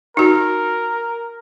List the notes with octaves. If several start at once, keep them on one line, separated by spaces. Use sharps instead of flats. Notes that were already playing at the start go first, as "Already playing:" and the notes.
D#4 F#4 A#4